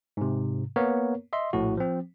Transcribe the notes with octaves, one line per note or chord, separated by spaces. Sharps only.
G#2 C3
A#3 B3 A#4 C#5
D#5 E5 C6
A#1 A2 F#4
F3 C4